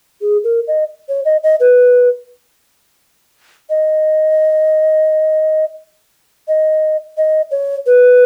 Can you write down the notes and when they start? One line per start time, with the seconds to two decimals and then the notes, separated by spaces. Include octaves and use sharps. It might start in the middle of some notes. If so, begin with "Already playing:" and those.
0.21 G#4
0.44 A#4
0.68 D#5
1.09 C#5
1.25 D#5
1.43 D#5
1.60 B4
3.70 D#5
6.48 D#5
7.17 D#5
7.51 C#5
7.86 B4